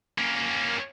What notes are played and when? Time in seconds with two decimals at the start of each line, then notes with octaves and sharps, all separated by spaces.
0.18 A#3 C#4